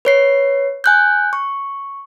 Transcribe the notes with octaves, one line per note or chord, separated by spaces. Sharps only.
B4 C#5 C7
G#5 F#6 G6
C#6